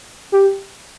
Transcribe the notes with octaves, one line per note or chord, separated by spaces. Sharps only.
G4